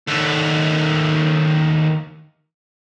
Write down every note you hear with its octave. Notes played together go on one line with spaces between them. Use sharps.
D#2 A3